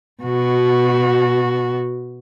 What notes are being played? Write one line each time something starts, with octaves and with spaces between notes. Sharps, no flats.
B2 F#4